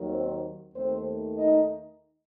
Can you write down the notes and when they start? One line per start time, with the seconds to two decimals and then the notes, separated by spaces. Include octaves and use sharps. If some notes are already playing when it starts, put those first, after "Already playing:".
Already playing: D#2 D#3 F#3
0.08 C4 C5
0.74 D#2 D#3 A3 C4 C5
1.38 D#4 D#5